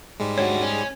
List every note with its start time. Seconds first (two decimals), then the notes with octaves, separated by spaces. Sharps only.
0.20 G#2 G3 G#3
0.38 D4 F#4 C#5
0.61 C#4